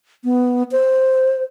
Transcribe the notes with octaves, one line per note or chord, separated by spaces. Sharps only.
B3
C5